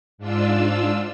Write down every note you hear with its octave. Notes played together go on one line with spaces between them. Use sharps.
G#2 D4 F4 E6